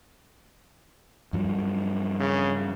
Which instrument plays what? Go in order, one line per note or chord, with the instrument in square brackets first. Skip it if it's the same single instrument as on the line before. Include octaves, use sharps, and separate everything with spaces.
[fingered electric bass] G2 F3 F#3
[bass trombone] C#3